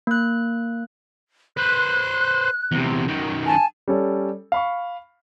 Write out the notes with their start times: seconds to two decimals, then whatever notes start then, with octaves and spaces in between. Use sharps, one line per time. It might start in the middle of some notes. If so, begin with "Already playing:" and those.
0.07 A#3 F#6
1.57 B4 C5 F#6
2.72 E2 C3
3.08 F#2 D#3
3.46 G#5 A5
3.88 G3 C#4 A4 C#5
4.52 F5 B5 C#6